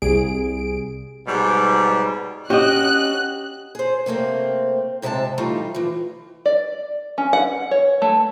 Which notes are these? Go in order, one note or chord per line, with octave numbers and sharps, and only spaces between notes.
C2 G#4 D7
G#2 B2 F#3 G3
C#4 F#4 G4 D#5 F#5 F#6
G#4 C5
C3 A3 A#3 C4
G#2 C3 G#3 E5 A5
E3 G3 A3 D#4 F4
E3 F3
D5
C#4
F#5
C#5
A3